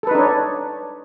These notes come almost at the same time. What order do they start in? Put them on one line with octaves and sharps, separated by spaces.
A4 B4 D#4 D4 C#5